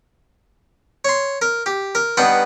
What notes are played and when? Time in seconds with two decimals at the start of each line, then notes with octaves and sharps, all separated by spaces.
1.05 C#5 C6
1.42 A#4
1.66 G4
1.95 A#4
2.17 G2 B3 D#4 F#5 G5